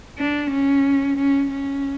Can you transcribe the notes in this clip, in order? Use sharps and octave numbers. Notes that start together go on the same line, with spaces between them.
D4
C#4
C#4
C#4